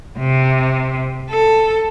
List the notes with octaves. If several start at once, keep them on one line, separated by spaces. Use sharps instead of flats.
C3
A4